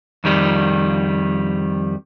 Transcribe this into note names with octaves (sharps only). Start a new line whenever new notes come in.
F2 D#3 G3